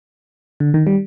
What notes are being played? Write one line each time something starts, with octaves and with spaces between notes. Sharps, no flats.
D3
D#3
G3